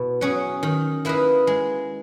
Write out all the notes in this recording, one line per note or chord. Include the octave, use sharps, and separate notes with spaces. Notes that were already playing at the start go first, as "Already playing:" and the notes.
Already playing: B2 E4
F#3 C#4 G#4
D#3
A#3 E4 B4 D#5
G#3